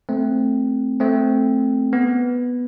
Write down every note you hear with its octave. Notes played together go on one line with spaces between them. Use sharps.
A3 C4
A3 C4
B3